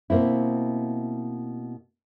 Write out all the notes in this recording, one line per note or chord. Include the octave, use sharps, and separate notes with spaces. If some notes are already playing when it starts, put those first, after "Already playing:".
B2 A#3 C4 E4